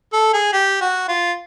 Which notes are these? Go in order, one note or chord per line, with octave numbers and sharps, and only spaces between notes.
A4
G#4
G4
F#4
F4